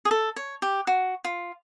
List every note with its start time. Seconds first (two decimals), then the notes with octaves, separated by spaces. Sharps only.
0.05 G#4
0.11 A4
0.36 C#5
0.62 G4
0.87 F#4
1.24 F4